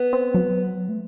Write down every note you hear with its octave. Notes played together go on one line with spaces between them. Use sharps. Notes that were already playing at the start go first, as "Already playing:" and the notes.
Already playing: B3
C4
F#3
A3